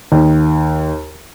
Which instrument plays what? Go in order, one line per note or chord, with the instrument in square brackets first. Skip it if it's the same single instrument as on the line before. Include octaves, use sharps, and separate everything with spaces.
[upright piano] D#2